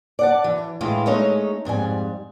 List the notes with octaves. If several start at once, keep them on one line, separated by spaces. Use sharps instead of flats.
D5 F#5 A5
E3
A2 E3 G#3 E4 F4
G#3 A3 C#4 D#4 C#5
F2 G#2 G3 G#5